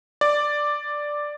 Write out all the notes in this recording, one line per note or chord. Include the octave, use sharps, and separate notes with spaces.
D5